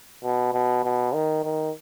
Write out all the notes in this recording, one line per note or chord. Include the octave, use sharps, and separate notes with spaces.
B2
B2
B2
D#3
D#3